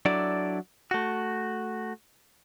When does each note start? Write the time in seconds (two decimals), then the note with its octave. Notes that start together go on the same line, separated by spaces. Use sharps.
0.05 F#3 D4 E4 A4 D5
0.91 A3 F#4